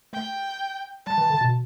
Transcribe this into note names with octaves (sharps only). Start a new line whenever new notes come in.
A3 G5
G3 A5
E3
D3
B2